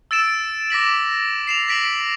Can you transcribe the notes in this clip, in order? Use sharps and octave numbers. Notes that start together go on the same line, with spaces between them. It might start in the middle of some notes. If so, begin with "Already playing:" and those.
E6 A6 D7 E7
D6 A#6 B6 F#7
C7 E7 F7
A#6 B6 D7 E7 F#7